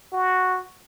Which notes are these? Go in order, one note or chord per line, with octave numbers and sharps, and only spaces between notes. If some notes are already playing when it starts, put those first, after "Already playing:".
F#4